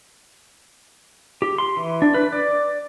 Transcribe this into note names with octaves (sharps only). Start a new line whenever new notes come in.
G4
C6
E3
D4
B4
D5